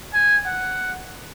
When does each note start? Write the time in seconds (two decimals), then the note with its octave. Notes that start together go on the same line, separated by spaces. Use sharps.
0.14 G#5
0.46 F#5